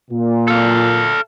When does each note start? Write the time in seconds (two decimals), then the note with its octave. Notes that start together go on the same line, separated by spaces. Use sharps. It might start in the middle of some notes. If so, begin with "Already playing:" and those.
0.11 A#2
0.48 A4 F5